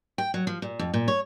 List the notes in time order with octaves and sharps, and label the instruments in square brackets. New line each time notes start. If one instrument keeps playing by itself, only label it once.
[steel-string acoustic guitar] G5
F#3
F3
A#2
F2
A#2
C#5